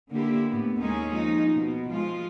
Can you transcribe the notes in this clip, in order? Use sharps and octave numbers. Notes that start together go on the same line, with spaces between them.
D3 A#3 E4 G4
A2 B3
D#2 G#3 C#4 D#4 G#4
F3 D#4
B2
F3 G#3 F4